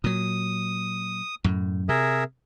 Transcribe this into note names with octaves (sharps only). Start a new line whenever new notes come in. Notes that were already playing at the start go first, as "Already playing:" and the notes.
A#2 F#3 D#6
F#2 A2
C3 G#4 A#4 E5